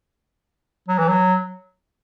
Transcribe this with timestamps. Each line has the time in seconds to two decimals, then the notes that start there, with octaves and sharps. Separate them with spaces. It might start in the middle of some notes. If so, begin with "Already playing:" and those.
0.88 F#3
0.99 E3
1.09 F#3